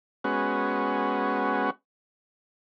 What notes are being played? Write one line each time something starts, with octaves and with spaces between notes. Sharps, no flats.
G#3 B3 C#4 F#4